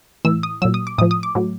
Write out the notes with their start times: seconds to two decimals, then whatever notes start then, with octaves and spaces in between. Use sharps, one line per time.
0.25 A2 E3 E6
0.43 D#6
0.62 A#2 F#3 E6
0.74 D#6
0.87 D6
0.98 A2 F3 D#6
1.11 D#6
1.23 D6
1.35 A2 F#3